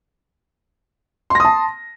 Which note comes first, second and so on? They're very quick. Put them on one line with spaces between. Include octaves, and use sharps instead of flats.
C6 A#6 D#6 A5